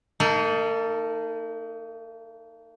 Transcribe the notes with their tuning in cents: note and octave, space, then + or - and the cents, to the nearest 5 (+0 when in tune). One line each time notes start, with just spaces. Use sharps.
A#3 -40 D#4 +0 A4 +0